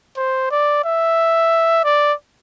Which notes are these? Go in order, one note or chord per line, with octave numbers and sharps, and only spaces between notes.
C5
D5
E5
D5